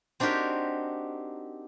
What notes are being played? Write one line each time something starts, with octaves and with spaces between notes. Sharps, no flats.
C4 D4 D#4 F#4 G4 A#4